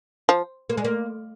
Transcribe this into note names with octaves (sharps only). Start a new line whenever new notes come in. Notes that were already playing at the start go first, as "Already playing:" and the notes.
F3
A#3
G#3
A#3